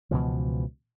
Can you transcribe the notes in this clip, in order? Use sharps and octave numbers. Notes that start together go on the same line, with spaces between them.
C#2 B2 E3 F3